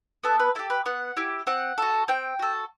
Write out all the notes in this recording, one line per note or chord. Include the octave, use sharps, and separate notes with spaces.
B3 A4
B4
E4 G4 A4
B4
B3 F#5
E4 G4
C4 F#5
F#4 A4
C4 G5
F#4 A4